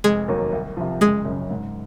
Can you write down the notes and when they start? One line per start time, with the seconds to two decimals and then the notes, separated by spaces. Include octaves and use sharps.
0.04 F1 G#3 G#4
0.28 D#2 D#3 F#3 A#3
0.52 C2
0.77 C3 F3
1.01 F#1 G#3 G#4
1.25 F#2
1.31 C#3
1.50 G#2